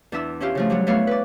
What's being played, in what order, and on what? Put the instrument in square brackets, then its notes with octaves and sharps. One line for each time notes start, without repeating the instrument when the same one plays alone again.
[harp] E2 D4 E4 E5 E6
C#4 E4 F4 G4
C#3 F3 A3
F#3 G3 F#4
A3 B3 D4 E4 C#5 F5
B4 D5